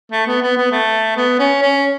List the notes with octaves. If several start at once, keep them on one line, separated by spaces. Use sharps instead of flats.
A3
B3
B3
B3
A3
B3
C#4
C#4